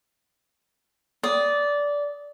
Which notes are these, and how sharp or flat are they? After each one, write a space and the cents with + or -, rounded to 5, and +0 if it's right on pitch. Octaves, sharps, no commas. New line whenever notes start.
D5 -15 D#6 +0